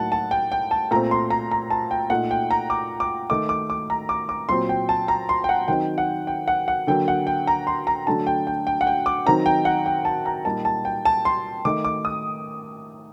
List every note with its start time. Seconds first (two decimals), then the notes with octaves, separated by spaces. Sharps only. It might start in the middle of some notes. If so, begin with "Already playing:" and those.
Already playing: A2 F#3 A#3 D#4 F#5 A5
0.12 A5
0.31 G5
0.52 G5
0.71 A5
0.91 A#2 A3 C4 A#5
1.11 C6
1.30 A#5
1.51 A#5
1.70 A5
1.91 G5
2.10 A#2 A3 D#4 F#5
2.31 G5
2.51 A#5
2.70 D6
3.00 D6
3.30 D#3 A3 D#4 D6
3.49 D6
3.70 D6
3.90 A#5
4.09 D6
4.29 D6
4.49 A#2 F#3 C4 C6
4.69 G5
4.89 A5
5.08 A#5
5.29 C6
5.44 G5
5.49 F#5
5.68 D#3 F#3 C4 D#4 G5
5.98 F#5
6.27 G5
6.48 F#5
6.68 F#5
6.87 D3 F#3 A#3 G5
7.08 F#5
7.27 G5
7.47 A#5
7.67 C6
7.87 A#5
8.07 D3 F#3 A3 D4 A5
8.27 G5
8.47 G5
8.67 G5
8.81 F#5
8.87 G5
9.06 D6
9.26 D#3 F#3 C4 D#4 A#5
9.46 G5
9.65 F#5
9.86 G5
10.05 A5
10.26 A#5
10.45 A#2 G3 A#3 D#4 A5
10.65 A5
10.85 G5
11.05 A5
11.25 C6
11.65 D#3 A3 D#4 D6
11.84 D6
12.05 D#6